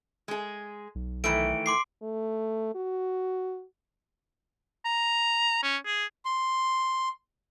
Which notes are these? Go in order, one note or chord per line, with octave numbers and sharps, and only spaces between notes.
G#3 G#4
B1
D#3 E3 A3 D7
C6 D6 C7
A3
F#4
A#5
C#4
G#4
C6